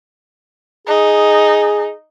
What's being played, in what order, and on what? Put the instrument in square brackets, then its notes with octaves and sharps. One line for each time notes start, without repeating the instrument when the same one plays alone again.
[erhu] D#4 [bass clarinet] G#4